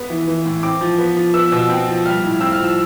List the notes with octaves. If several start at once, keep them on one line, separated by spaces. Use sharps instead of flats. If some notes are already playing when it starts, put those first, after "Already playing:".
Already playing: B3
E3
E3
A2
C4 D6
F3
B3
F3
B3 E6
B2
C4
F3
G3 F6
A2
C4 E6
F6
F3
E6